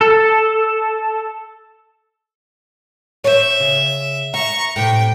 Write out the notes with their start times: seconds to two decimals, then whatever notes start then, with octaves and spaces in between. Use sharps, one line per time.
0.01 A4
3.24 C5 C#5 E5
3.60 C#3
4.34 E5 A#5 C#6
4.76 A2 C3 G5